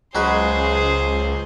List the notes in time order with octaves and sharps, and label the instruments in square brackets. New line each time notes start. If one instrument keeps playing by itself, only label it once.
[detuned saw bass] C#2 [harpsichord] F#3 G#3 B4 [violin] G#4 C5